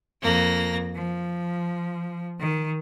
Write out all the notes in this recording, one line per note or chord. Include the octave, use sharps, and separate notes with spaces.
F2 A#3 A#6
F3
D#3